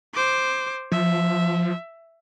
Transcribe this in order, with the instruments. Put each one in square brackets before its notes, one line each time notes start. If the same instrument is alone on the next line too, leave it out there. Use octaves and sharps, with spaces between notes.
[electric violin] C5 D6
[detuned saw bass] F3 [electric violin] E5